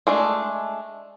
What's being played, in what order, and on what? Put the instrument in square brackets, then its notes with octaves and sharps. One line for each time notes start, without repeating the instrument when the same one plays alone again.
[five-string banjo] G#3 A3 D4